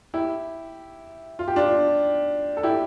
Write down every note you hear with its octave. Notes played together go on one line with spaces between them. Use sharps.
E4 G4
F4
G4
D4 F4
A4
E4 G4